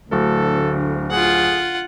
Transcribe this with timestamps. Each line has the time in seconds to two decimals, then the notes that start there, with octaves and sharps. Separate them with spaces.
0.12 D1 D2 A4
1.11 F4 G#4 F#5